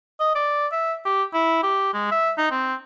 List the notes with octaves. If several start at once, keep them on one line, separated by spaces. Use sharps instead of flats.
D#5
D5
E5
G4
E4
G4
G#3
E5
D#4
C4